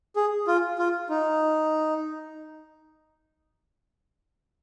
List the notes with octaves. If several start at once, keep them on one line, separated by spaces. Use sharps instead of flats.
G#4
F4
F4
D#4